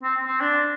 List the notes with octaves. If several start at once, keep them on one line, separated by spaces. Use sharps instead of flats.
C4
C4
D4